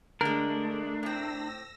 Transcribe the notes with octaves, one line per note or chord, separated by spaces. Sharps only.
D3 G#3 A3 D4 A#4
A2 C4 E6 A#6